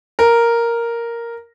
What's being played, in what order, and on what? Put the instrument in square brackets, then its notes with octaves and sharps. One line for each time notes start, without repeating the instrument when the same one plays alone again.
[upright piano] A#4